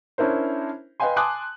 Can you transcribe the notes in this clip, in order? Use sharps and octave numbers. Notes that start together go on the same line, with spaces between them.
C#4 D4 E4 A#4 C5
B4 D#5 F5 G5 G#5 C6
G#5 A5 C6 D6 D#6 F#6